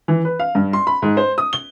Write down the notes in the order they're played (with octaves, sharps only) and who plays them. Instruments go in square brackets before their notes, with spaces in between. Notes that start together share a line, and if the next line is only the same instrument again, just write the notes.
[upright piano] E3
B4
F5
G2
C6
B5
G#2
C5
D#6
G7